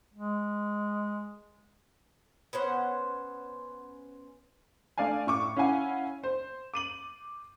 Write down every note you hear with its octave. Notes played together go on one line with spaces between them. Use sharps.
G#3
B3 C#4 C5 F#5
A3 D4 D5 F5 G#5
A2 C#6 D6
C#4 E4 F5 F#5 G#5
C5
D6 D#7 F#7